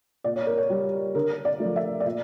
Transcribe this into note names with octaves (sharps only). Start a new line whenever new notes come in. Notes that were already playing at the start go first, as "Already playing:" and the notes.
A#2 D5
C#5
A#4
C#5
G3
D3 A#4
D5
A3
F3
E5
D5
A#2 E5